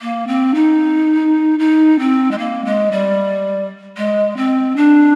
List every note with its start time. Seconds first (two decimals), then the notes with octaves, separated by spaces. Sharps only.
0.01 A#3
0.27 C4
0.54 D#4
1.59 D#4
1.99 C4
2.31 G#3
2.38 A#3
2.65 G#3
2.91 G3
3.97 G#3
4.36 C4
4.76 D4